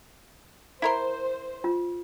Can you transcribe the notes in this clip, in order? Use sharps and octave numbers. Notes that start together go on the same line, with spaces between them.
E4 A#4 C5 C6
F4